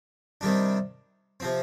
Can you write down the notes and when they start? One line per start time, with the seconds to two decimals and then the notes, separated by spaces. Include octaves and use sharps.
0.41 C3 D#3 G3 D4
1.40 C3 F3 C4